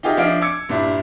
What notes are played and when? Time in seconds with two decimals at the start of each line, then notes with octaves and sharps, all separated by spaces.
0.03 D#4 F4 G4 G#4 D#5 E5
0.17 F3 D4 E5 F5 D7
0.42 D6 E6 G#6 C#7
0.69 G2 A#2 D4 E4